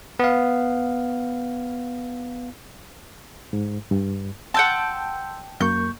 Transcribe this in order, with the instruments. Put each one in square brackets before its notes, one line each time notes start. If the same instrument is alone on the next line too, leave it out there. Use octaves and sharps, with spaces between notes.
[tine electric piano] B3 F5
[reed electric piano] G#2
G2
[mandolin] F#5 G5 A5 [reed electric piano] C6 E6 G6
[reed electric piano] F#2 A#3 C#6 [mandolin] G6